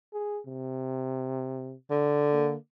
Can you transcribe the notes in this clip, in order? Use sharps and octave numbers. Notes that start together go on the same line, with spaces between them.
G#4
C3
D3
A#3